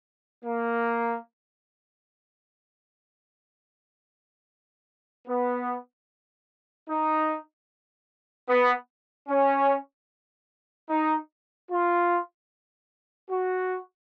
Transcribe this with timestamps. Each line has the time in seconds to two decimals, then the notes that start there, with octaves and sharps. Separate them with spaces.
0.44 A#3
5.27 B3
6.88 D#4
8.48 B3
9.28 C#4
10.90 D#4
11.69 F4
13.30 F#4